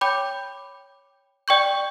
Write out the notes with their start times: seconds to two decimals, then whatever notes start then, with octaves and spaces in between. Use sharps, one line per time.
0.01 C#5 G5 B5 D6 G6
1.48 D5 G5 C#6 G6